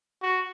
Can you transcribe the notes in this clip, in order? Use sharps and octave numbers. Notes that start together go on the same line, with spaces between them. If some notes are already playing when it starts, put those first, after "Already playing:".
F#4